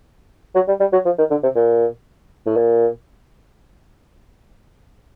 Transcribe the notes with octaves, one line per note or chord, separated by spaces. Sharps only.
F#3
G3
G3
F#3
F3
D#3
D3
C3
A#2
A2
A#2